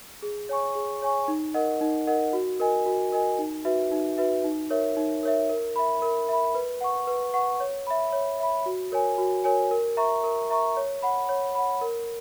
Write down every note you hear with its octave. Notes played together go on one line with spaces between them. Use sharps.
G#4
C#5 G#5 C#6
G#4
C#5 G#5 C#6
D#4
A#4 D#5 F#5
D#4
A#4 D#5 F#5
F#4
A#4 D#5 G#5
F#4
A#4 D#5 G#5
D#4
F#4 B4 E5
D#4
F#4 B4 E5
D#4
A#4 C#5 E5
D#4
A#4 C#5 E5
A#4
E5 B5
A#4
E5 B5
B4
F#5 C#6
B4
F#5 C#6
C#5
E5 B5
C#5
E5 B5
F#4
A#4 C#5 G#5
F#4
A#4 C#5 G#5
A#4
E5 A#5 C#6
A#4
E5 A#5 C#6
C#5
F#5 B5
C#5
F#5 B5
A#4